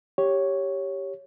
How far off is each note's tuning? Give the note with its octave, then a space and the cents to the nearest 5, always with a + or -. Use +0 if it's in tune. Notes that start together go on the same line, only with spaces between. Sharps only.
G4 +0 C#5 +0